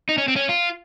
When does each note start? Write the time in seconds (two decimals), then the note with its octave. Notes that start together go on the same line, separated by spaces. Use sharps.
0.09 D#4
0.18 C#4
0.28 C4
0.36 C#4
0.49 F4